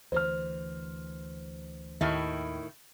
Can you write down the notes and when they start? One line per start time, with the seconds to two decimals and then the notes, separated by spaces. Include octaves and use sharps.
0.12 D2 E3 C5 F6
2.01 D#2 A2 D#3 E4